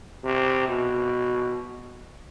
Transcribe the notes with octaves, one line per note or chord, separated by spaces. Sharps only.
C3
B2